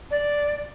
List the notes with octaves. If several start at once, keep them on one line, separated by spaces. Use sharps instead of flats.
D5